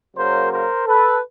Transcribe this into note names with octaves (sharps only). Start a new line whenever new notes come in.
C#3 F#3 A#3 A#4 C5
A#4 C5
A4 B4